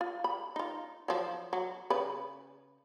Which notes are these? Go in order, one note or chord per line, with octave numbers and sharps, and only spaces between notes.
F4
B5
D#4 F4
F3 F#3
F#3
C#3 B4